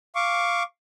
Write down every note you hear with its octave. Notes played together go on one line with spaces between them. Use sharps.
F5 C#6 D6